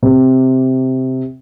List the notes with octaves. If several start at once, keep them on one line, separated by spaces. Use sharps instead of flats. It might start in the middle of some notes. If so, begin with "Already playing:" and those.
C3